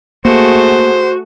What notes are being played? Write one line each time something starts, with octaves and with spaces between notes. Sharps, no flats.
A3 A#3 F#4 G#4 C5